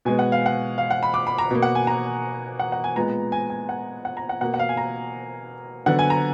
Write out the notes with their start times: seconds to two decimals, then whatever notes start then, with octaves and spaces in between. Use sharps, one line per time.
0.05 B2 G#3 B3 G#5
0.19 F#5
0.32 F5
0.46 F#5
0.78 F5
0.91 F#5
1.03 B5
1.14 D6
1.27 B5
1.38 A#5
1.51 B2 A#3
1.62 F#5
1.75 G#5
1.87 A#5
2.59 F#5
2.72 F#5
2.84 G#5
2.96 A#2 G#3 B3 A#5
3.32 G#5
3.50 G#5
3.69 F#5
4.05 F#5
4.17 A#5
4.29 F#5
4.41 B2 A#3 F#5
4.54 F#5
4.59 F5
4.69 G#5
4.77 A#5
5.86 D3 F#3 B3 F#5
5.99 G#5
6.10 A#5